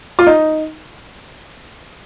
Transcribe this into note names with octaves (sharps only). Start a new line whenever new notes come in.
F4
D#4